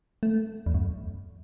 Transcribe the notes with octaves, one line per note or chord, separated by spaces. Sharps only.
A3
E2
F#2